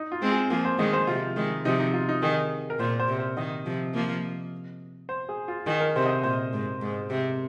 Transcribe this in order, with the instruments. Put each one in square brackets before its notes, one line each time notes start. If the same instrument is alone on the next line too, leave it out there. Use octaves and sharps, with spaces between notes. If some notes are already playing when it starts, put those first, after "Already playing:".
Already playing: [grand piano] D#4
F4
[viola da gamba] G#3 C4
[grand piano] G#4
[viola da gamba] F3 A#3 [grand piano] G#4
[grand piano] C5
[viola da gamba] D#3 G#3 [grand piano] D#5
[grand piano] C5
[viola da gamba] C3 F3 [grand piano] F4
[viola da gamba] D#3 G#3
[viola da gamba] C3 F3 [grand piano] D#4
[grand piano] D#4
F4
D#4
[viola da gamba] D#3 [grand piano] G#4
[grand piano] A#4
[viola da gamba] A#2 [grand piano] C5
[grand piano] C5
[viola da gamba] C3
[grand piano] C5
[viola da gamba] D#3 [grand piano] D#5
[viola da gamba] C3 F3
F3 A#3
[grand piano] C5
G#4
F4
[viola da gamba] D#3 [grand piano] G#4
[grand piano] A#4
[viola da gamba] C3 [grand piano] C5
[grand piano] D#5
C5
[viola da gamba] A#2 [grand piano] C5
[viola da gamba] G#2
G#2
C3